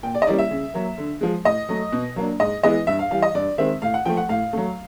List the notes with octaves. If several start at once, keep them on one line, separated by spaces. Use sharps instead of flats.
A#2 G5
D5
D#5
G3 A#3 C#4 E4 D5
E5
C#3
F#3 A#3
D3
F3 G#3
A2 D#5
F#3 A3
B2
F#3 A#3 D4
G#2 D#5
E3 G#3 B3 E4 D#5
G2 E5
F5
E3 G3 F5
D#5
G2 D5
D#3 G#3 C4 E5
A2 F5
F#5
F3 A3 G5
F#5
A2 F5
F#3 A3